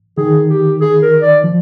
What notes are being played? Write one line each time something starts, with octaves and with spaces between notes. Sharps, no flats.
D#3 G#4
G4
G#4
A#4
D5
F3